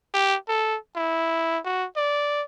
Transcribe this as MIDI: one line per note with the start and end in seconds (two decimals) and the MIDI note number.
0.14 0.36 67
0.48 0.77 69
0.96 1.59 64
1.65 1.86 66
1.97 2.43 74